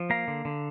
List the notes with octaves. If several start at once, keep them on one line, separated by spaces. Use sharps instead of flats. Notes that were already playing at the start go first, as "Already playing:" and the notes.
Already playing: F3
A#3 F5 A#5
D3
D3